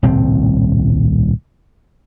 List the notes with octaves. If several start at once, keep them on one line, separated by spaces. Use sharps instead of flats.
D#1 C2 A2 C4